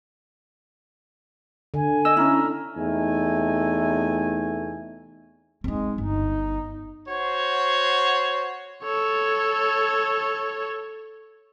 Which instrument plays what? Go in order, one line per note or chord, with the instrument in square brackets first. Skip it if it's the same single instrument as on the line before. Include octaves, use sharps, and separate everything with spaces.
[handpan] D3 [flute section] G#5
[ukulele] D#5 [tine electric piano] E6
[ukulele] C#4 E4 [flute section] E5 A#5 F6
[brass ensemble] E2 C3 A3 D#4 G#5
[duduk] G#3 [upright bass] C4 D#4
[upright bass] G1 [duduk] D#4
[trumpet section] F#4 C5 C#5
[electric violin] A4 C#5